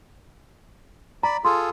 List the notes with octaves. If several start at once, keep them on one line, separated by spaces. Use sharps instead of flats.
D5 A#5 B5
F4 G#4 A4 C6